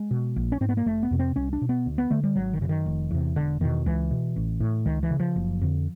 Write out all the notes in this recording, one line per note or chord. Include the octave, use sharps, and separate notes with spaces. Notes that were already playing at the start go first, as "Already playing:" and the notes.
Already playing: G#3
B2
A#1
C#4
G#2 C4
B3
A#3
F1 A3
B3
F2 C3
C4
C2 C#4
D4
B2
B3
D2
B3
D3 A3
G3
G#1 F#3
D#3
F#2 C#3
D#3
F1
E2 C3
E1 D3
E2 B2 D#3
C#2 E3
B2
A1
A2
C#2 D#3
E3
C#3
F3
F#1
F2 D3